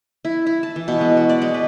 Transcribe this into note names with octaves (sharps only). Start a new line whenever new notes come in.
E4
E4
A5
E3
B2
G#3
F#4
D5
G#3
B4